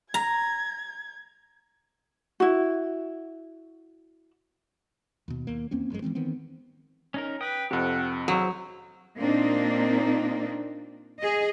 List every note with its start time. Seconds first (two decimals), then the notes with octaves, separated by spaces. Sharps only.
0.14 A#5 G#6
2.40 E4 F#4
5.28 D#2 B2
5.47 D#2 A#3
5.71 E2 A#3 C4 C#4
5.90 G#1 F#2 B2 G#3
6.02 E3 F#3 G#3 C4
6.15 D#3 E3 B3 C4
7.14 C#4 D#4 A#4
7.41 B4 G5 D#6
7.71 F2 C3 G4 A4 F#5
8.28 F#3 E4 G#4 C5
9.17 A#2 A#3 C4 D4 D#4
11.20 G#4 D#5